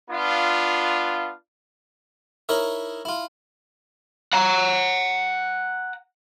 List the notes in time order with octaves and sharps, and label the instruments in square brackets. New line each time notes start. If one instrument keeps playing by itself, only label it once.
[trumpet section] B3 D4 F4
[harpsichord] D#4 E4 A#4 C#5 E5
E4 F4
[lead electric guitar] F#5 A#5